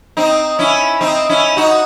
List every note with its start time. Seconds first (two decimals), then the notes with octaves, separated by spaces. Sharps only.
0.17 C4 D#4
0.59 C#4 E4
1.01 C4 D#4
1.29 C#4 E4
1.57 D#4 F#4